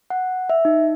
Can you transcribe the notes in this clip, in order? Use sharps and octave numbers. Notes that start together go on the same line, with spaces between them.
F#5
E5
D#4